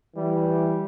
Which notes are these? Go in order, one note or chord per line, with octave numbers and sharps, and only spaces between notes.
E3 G3